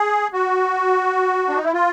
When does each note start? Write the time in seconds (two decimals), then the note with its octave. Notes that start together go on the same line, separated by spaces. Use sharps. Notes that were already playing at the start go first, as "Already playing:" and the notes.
Already playing: G#4
0.33 F#4
1.49 D4
1.57 D#4
1.64 E4
1.73 F4